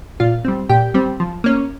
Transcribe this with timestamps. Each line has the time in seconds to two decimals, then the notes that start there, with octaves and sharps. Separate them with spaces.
0.20 A#2 F4 F5
0.45 G3 C4
0.69 A#2 G4 G5
0.94 G3 C4
1.20 F3
1.44 A#3 C#4